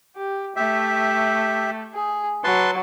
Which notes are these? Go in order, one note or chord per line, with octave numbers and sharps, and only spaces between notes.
G4
A3 G4 E5
G#4
F#3 B4 A5 C6